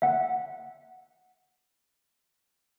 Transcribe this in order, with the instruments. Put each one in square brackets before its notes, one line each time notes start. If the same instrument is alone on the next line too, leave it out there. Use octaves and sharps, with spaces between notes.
[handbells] E5 F#5